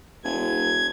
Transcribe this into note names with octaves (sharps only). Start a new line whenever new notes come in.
E1 G#6